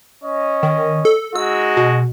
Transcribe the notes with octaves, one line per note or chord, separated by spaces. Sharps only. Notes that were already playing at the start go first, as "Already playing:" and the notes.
C#4 D#5
D#3
A4
G#3 D#4 F#4 E6
B2